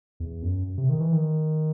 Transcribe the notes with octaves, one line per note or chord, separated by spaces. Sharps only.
E2
F#2
C3
D#3
E3
D#3